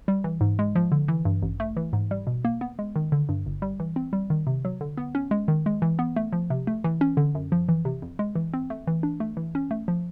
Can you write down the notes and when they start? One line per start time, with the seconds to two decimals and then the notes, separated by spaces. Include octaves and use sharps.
0.08 G3
0.24 E3
0.41 G#2
0.59 G#3
0.76 F3
0.92 D3
1.08 E3
1.25 G2
1.42 A1
1.60 A3
1.77 E3
1.93 G#2
2.11 G3
2.27 B2
2.45 A#3
2.61 B3
2.79 G#3
2.96 D#3
3.12 D3
3.29 G2
3.46 G1
3.62 G3
3.80 E3
3.96 C4
4.13 G3
4.30 D#3
4.47 C3
4.65 F#3
4.81 D3
4.97 B3
5.15 C#4
5.31 G#3
5.48 D#3
5.66 G#3
5.82 E3
5.99 B3
6.16 A3
6.33 F3
6.50 C3
6.67 A3
6.84 E3
7.01 C#4
7.17 D3
7.35 F#2
7.52 F3
7.69 E3
7.85 C3
8.02 F2
8.19 G#3
8.35 E3
8.54 C4
8.70 A3
8.87 E3
9.03 D4
9.20 A3
9.37 E3
9.55 C#4
9.71 A3
9.88 F3